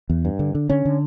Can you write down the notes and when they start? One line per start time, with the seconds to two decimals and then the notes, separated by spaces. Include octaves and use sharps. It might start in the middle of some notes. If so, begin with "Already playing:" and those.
0.10 E2
0.25 G2
0.39 D3
0.55 D3
0.70 D3 C#4
0.85 D3